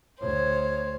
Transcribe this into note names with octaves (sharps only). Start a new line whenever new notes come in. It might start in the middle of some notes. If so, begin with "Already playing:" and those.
D2 C5 C#5